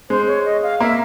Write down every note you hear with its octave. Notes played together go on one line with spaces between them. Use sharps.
G#3 C5
C#5
D#5
F5
A#3 E5